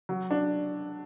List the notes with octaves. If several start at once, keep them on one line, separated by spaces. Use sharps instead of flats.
F#3
D4